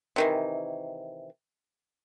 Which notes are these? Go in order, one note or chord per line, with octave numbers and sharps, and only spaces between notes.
C3 D#3 E3